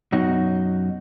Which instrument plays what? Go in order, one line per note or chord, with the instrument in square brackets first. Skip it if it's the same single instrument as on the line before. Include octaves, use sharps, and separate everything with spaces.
[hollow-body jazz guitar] F#2 B2 D#4 F#4